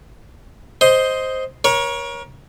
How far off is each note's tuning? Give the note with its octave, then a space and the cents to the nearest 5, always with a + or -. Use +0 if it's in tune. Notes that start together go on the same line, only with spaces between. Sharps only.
C5 +0 D#5 +10
A#4 +35 C#5 +0